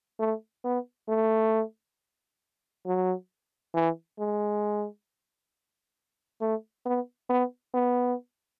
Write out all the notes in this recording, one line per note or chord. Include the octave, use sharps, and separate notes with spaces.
A3
B3
A3
F#3
E3
G#3
A3
B3
B3
B3